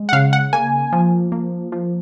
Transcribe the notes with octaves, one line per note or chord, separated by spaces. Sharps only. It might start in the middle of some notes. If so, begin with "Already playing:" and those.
Already playing: G#3
F#5
C#3 F5
F#5
A#3 G#5
F3
A#3
F3